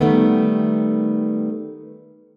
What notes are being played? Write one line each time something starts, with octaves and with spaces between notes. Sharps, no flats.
D#3 G3 A3 B3